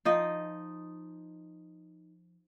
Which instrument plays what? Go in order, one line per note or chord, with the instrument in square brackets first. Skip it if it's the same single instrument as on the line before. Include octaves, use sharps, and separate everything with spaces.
[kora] F3 D#4 D#5